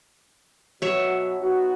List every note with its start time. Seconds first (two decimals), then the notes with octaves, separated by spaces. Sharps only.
0.82 B2 F#3 C#5 E5
1.40 B3 D#4 F#4